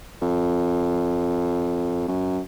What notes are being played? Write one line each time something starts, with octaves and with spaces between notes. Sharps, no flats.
F2
F#2